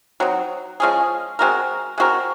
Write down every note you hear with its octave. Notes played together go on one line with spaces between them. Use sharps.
F#3 C4 D#4
F3 G#3 C#4 G#4
G#3 C4 F#4 A#4
G#3 C4 F#4 A#4